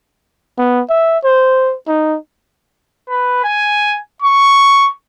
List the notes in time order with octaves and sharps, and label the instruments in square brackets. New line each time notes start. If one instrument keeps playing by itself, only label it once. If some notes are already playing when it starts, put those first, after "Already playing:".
[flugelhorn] B3
E5
C5
D#4
[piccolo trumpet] B4
G#5
C#6